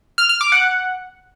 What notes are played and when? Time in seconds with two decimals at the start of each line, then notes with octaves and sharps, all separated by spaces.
0.18 F6
0.29 F6
0.41 D6
0.52 F#5